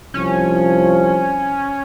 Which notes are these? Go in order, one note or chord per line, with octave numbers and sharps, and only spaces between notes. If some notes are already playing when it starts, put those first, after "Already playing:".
C2 F3 C#4